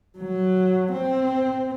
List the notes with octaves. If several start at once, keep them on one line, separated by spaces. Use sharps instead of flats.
F#3
C4